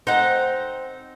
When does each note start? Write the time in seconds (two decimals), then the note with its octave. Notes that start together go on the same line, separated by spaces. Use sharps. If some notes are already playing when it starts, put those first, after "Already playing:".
0.07 C4 D#4 F#5